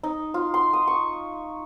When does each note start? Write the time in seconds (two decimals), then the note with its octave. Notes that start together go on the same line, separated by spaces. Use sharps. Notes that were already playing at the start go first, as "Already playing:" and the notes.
0.03 D#4
0.34 F4
0.54 C6
0.73 D#6
0.87 C#6